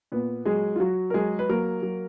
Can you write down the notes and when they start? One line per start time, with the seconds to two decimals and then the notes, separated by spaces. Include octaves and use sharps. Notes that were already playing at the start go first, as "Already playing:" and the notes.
0.12 A#2 B3 B4
0.45 F#3 G#3 G#4
0.76 F4
0.80 F#3 F#4
1.10 A#4
1.14 F#3 G#3 G#4
1.39 B4
1.49 F#3 A#3 A#4
1.83 F#3